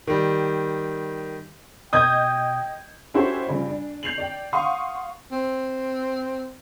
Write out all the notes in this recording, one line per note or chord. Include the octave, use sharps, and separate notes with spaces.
D#3 G3
B2 D#5 G5 D#6 G6 G#6
C#4 E4 F#4 G4 A4 C5
G2 C#3 F3
D4
G6 C7 F7 F#7
D5 G5
F5 F#5 C6 C#6 D#6
C4